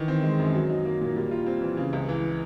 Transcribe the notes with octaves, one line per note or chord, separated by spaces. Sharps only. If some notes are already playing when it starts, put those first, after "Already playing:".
Already playing: D#3 E3
C4
G#3
F#2
F#3
D#4
A#3
A#2
G3
F4
C4
E3
C#3
C#2
E3